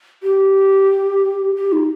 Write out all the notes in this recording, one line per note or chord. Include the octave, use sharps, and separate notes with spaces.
G4
G4
D#4